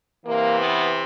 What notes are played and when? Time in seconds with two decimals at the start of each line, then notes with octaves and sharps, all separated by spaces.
0.24 C3 E3 A#3
0.57 B3